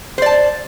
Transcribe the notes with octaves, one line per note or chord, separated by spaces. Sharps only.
C5 D5 A5